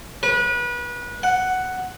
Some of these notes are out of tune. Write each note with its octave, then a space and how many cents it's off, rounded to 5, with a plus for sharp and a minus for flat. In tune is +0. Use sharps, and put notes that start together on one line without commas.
B4 -30
F#5 +5